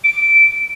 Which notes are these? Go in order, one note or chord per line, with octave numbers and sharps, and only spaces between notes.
D7